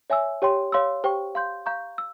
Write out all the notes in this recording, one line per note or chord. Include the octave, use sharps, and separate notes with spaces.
C#5 E5 G#5 E6
G4 C#5 G5 C6
C#5 F5 C6 E6
G4 C5 G5 C#6
F5 C6 G6
F5 A#5 C#6 G6
E6